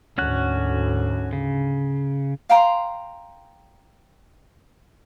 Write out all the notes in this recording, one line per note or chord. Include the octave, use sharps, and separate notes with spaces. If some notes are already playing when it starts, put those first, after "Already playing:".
D2 G#2 D3 C#4 F#4 F#6
C#3
F5 G5 A#5 C6